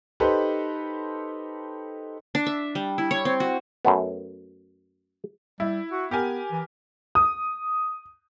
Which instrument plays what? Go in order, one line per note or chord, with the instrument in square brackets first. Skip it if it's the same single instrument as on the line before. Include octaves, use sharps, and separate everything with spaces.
[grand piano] D#4 G4 A4 B4 C5
[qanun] D4
E5
G3
E4
C#5
C4
F#4
[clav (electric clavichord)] F#2 A3 B3
[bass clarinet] G3 [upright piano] E4
[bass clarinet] F#4
[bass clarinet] B3 [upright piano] G4 A#4 G#5
[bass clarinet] E3
[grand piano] D#6